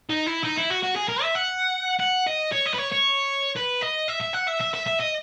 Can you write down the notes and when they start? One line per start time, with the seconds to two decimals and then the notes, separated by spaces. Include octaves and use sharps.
0.10 D#4
0.26 E4
0.44 D#4
0.57 E4
0.70 F#4
0.83 F#4
0.96 G#4
1.08 A#4
1.22 E5
1.35 F#5
2.00 F#5
2.27 D#5
2.52 C#5
2.66 D#5
2.74 B4
2.78 C#5
2.92 C#5
3.57 B4
3.82 D#5
4.09 E5
4.21 E5
4.34 F#5
4.48 E5
4.61 E5
4.74 E5
4.86 E5
5.00 D#5